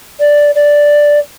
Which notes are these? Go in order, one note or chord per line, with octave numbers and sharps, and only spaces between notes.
D5
D5